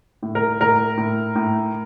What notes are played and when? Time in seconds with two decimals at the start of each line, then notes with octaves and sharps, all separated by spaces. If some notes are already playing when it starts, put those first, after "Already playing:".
0.23 A2
0.35 A#4
0.61 A2 A#4
0.97 A2
1.35 A2